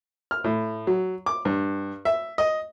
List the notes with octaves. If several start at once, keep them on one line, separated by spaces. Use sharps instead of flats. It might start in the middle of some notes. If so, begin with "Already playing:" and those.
F6
A2
F#3
D6
G2
E5
D#5